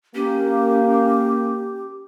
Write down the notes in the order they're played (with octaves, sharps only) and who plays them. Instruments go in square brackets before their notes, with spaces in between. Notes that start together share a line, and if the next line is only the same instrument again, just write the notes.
[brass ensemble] A#3 [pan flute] C#4 [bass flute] G4